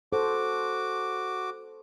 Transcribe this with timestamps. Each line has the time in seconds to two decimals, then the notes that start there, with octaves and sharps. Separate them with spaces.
0.13 F#4 A4 C5 D6